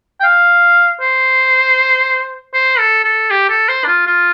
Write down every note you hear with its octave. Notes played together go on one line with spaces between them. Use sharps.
G5
F5
C5
C5
A4
A4
G4
A4
C5
D4
F4
F4